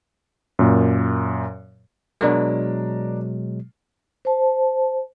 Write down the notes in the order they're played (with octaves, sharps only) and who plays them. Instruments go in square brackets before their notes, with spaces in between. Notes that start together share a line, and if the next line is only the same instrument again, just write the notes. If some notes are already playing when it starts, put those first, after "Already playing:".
[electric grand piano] F#2 A#2
[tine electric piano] B2 F#3 G#3 [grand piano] D4 A#4
[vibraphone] C5 A5